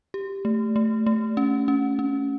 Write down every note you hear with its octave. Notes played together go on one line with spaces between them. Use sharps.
G4
A3
A3
A3
C#4
C#4
C#4